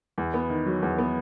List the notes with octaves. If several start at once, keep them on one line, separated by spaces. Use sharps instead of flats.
E2
B3
D#3
F#3
E2
B3